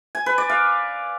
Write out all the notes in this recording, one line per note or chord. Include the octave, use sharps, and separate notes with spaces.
G#5
B4
D5
F5